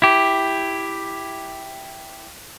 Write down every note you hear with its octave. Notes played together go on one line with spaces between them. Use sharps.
E4 G4